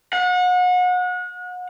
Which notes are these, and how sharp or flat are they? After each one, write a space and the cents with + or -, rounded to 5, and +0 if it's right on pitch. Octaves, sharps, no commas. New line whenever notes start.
F#5 -35